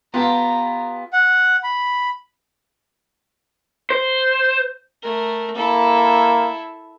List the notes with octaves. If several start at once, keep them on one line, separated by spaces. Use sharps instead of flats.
B3 F4 G4 A4 A#5
F#5
B5
C5
A3 A#4
A#3 E4 A4